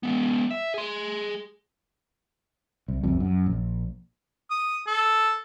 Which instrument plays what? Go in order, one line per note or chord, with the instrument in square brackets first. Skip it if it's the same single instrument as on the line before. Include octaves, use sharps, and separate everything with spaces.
[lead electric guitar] G#3 B3
E5
G#4 C6
[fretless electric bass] C2
F#1 C2 F2
F#2
A#1
[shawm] D#6
A4